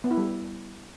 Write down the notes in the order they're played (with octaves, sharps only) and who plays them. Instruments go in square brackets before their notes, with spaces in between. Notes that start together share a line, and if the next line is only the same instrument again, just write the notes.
[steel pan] B3
E4
G3